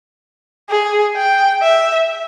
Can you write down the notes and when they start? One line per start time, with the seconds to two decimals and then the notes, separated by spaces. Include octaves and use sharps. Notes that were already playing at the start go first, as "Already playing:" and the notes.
0.70 G#4
1.16 G5
1.62 E5